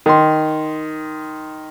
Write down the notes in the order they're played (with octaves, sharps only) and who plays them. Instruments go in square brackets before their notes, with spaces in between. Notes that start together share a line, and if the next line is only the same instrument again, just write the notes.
[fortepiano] D#3 C6